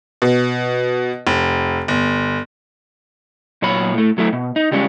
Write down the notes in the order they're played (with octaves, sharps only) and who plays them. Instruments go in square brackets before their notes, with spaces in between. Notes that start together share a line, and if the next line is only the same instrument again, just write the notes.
[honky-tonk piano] B2
F1
G1
[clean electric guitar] A#2 F#3 C#5 B5
A2 A3
F#3 A3 E4
B2
D#4
C#2 G3 G#3 C#4